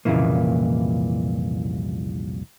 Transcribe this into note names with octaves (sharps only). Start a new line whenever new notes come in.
C2 F2 A#2 C#3 E3 A#3